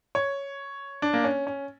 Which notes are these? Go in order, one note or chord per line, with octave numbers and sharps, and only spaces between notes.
C#5
D4
A#3
C#4
C#4